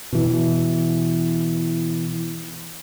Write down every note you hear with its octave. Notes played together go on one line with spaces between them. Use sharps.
B2 E3